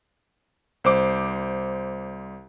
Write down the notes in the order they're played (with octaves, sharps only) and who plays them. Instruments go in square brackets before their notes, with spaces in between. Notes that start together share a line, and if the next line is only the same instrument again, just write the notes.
[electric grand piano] C2 C5 D6